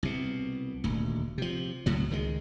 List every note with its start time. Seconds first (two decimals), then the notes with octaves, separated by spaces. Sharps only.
0.03 C2 B2
0.84 D#1 D2
1.38 C3 F3
1.86 C#2 A2 F#3
2.10 C#2 D#3 E3 G#3